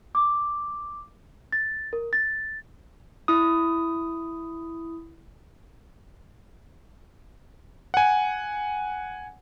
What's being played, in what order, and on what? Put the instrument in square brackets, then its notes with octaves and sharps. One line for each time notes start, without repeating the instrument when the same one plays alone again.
[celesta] D6
A6
A#4
A6
[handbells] E4 D#6
[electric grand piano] F#5 G#5